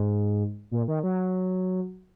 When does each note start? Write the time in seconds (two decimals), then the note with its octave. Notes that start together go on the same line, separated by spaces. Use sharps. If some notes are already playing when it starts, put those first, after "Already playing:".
Already playing: G#2
0.71 A#2
0.88 D#3
1.03 F#3